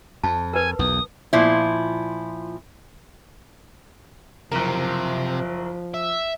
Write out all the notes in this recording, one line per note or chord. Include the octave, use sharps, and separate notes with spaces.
F2 A5
A#4 B4 G#5
B1 E2 D#6
A#2 F3 E4
F#1 C3 F3 A#4
E5